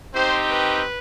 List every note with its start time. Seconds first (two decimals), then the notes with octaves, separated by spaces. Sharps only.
0.14 C4 D#4 G4 C5
0.50 B4